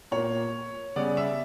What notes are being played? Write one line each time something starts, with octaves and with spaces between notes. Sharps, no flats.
A#2 A#3 C#5
C#3 G3 B3 D5
E5